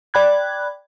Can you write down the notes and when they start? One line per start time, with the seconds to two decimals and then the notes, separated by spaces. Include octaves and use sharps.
0.14 D5 G5 B5 F#6 G#6